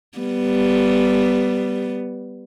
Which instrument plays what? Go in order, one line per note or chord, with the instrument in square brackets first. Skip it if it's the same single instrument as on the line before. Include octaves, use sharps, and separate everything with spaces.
[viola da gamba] G3 B3